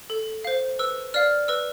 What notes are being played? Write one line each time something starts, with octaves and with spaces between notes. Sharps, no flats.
A4
C5 F5
B4 E6
D5 F5 F6
B4 E6